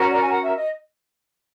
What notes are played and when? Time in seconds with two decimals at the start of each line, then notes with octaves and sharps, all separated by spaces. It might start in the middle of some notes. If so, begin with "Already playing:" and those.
Already playing: C#4 F#4 A#4
0.10 D5
0.21 G#5
0.32 F#5
0.43 E5
0.57 D#5